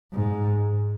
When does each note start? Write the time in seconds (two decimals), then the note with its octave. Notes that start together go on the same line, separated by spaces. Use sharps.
0.13 G#2